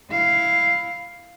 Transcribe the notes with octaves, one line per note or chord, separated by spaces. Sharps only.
E4 F5